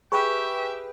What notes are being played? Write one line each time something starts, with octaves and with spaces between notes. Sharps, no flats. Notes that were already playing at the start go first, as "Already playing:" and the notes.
G4 G#4 B4 E5 G5 C#6